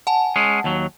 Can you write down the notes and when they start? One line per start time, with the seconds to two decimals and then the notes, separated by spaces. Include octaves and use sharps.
0.07 F#5 G#5 A5
0.36 G#3 C#4
0.64 D#2 F#3